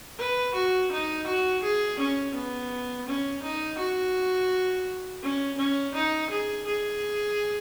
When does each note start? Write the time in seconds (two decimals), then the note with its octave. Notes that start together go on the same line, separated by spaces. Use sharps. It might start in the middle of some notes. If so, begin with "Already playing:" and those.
0.18 B4
0.54 F#4
0.91 D#4
1.27 F#4
1.62 G#4
1.99 C#4
2.35 B3
3.07 C#4
3.43 D#4
3.78 F#4
5.23 C#4
5.58 C#4
5.95 D#4
6.30 G#4
6.66 G#4